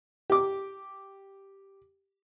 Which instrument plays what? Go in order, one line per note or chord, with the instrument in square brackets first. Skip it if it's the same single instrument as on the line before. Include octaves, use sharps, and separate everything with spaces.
[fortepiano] G4 D6